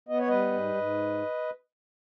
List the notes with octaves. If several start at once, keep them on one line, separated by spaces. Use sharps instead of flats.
B3 D#5
C#5
G3 B4 D#5
G#2
G#2